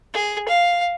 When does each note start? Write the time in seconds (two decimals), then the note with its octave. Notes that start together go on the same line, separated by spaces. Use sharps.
0.14 G#4
0.49 F5